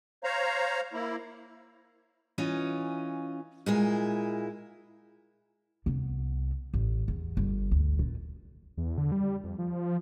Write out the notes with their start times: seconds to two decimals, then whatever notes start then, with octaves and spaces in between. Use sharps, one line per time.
0.24 C5 C#5 F5 A#5
0.93 A#3 E4
2.38 E3 C#4 F4 D#5
3.66 A#2 G#3 E4
5.86 C2 B3
6.74 A1
7.08 E2
7.37 G1
7.71 D2
7.99 A#2
8.77 E2
8.98 D3
9.12 G3
9.44 F2
9.58 F3